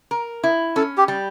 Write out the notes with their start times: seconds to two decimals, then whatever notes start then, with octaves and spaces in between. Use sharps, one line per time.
0.11 A#4
0.44 E4
0.76 C#4 A4
0.98 G4
1.08 G3